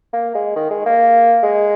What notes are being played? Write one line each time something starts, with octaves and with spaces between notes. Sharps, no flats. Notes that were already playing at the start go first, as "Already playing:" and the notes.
A#3
G#3
D#3
G#3
A#3
G#3